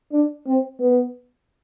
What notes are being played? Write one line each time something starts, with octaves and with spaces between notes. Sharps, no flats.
D4
C4
B3